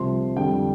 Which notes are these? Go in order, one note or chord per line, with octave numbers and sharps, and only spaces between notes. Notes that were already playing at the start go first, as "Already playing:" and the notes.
Already playing: C2 C3 F3 C6
F2 D3 G3 G5